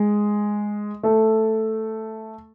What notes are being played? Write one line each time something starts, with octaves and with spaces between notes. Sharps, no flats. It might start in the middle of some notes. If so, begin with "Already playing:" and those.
Already playing: G#3
A3 A4